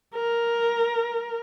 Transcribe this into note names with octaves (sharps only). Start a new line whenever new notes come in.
A#4